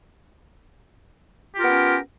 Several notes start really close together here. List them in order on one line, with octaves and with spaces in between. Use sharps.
G4 F4 A#4 B3 C#4